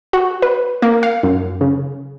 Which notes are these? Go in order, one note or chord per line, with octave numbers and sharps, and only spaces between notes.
F#4
B4
A#3
F5
F#2
C#3